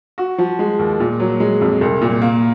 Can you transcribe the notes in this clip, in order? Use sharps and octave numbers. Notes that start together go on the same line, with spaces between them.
F#4
F3
G#3
D#2
A#2
F#3
G#3
F2
C2
A#2
A#3